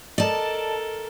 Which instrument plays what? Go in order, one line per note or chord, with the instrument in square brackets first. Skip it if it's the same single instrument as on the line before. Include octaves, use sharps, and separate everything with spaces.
[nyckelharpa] A4 A#4 [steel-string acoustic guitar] D5 A5 [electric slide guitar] D#5